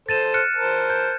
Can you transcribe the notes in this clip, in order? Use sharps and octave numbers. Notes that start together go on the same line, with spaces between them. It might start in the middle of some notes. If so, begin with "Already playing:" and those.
A4 C5 A6 D#7 E7
F6 F#6 C#7
A#4 C5 A5
G6